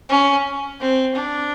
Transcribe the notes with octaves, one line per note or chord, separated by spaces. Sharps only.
C#4
C4
D4